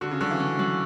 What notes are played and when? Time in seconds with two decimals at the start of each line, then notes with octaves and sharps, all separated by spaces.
0.01 D3 F#4
0.11 C#3
0.21 D3 F#3
0.31 E3
0.40 C#4
0.59 F#3